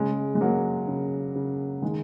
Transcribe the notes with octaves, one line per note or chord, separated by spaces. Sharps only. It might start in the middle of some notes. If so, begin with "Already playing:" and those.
Already playing: C#3 G#3
G#3
F#3 A#3
C#3
C#3
D#3 G#3